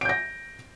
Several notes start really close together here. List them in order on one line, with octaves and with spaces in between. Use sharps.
D7 G6 A#6